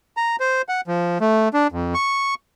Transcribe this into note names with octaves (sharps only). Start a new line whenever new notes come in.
A#5
C5
F#5
F3
A3
D4
F2
C#6